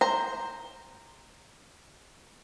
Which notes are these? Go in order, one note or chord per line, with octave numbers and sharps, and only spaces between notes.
C5 A#5